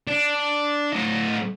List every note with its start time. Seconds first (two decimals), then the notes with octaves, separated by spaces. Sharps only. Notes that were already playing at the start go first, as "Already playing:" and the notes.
0.08 D4
0.93 A2 D#5